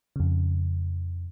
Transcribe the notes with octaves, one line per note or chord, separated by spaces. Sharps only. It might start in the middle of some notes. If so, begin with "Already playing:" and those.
F2 C#3